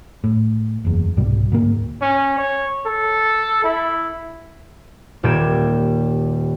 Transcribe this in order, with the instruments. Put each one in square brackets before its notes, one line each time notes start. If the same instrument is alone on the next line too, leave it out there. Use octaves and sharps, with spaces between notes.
[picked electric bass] A2
F#1 E2
C2 G#2 B2 G3
D2 G#2 A#3
[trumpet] C#4
C#5
A4
E4
[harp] D#1 A#2 G3 G5 G#6 E7